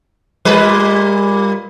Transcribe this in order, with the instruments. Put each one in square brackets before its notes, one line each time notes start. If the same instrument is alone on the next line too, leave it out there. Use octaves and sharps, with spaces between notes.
[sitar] A#2 G3 B4